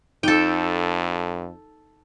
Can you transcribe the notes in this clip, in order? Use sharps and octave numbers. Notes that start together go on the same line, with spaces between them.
F2 D#4 A4 G5